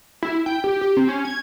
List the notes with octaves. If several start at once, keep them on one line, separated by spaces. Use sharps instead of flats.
E4
G5
G4
G4
C4
C#4
G#6